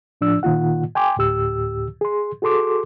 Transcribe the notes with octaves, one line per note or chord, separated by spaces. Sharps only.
A2 F3 D4 E6
A#2 D#3 A#3 F4 F#5
G5 G#5 C6 D6
D2 A2 G4 E6
G#4 C6
F#4 G#4 A4 C6 D6